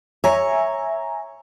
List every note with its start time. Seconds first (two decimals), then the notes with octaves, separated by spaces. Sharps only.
0.24 C#5 E5 G#5 A#5